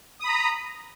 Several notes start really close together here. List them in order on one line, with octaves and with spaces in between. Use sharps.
D#6 B5 A#5